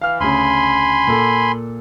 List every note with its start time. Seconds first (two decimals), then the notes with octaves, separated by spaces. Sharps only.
0.02 E3 F5 F6
0.20 D2 C#3 G#5 B5 C6
1.07 A#2 A#3 A4